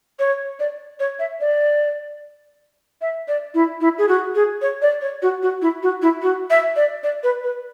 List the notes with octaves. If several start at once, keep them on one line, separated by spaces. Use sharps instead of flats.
C#5
D5
C#5
E5
D5
E5
D5
E4
E4
G#4
F#4
G#4
C#5
D5
C#5
F#4
F#4
E4
F#4
E4
F#4
E5
D5
D5
B4
B4